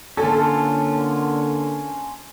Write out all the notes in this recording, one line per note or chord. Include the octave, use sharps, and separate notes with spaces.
D3 A#3 C#4 F4 A4